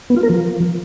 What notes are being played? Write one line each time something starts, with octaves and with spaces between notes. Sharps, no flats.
B3
F4
A#4
F3